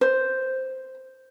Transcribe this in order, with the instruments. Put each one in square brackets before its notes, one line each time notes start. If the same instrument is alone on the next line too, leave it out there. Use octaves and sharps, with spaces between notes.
[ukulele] C5